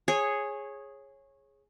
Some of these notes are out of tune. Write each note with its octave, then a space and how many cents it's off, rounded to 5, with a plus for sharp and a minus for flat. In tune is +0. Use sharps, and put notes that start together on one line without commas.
G#4 +0 C#5 -15